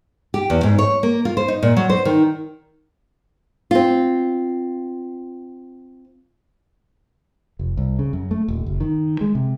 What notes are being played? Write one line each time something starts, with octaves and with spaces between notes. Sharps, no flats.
G4
E2
G#2
C#5
A#3
F4
C5
D#4
A#2
F#3
C5
D#3
C4 F4
F1
C2
C#3
F#2
A3
D#1
F#1
D#3
G#3
C3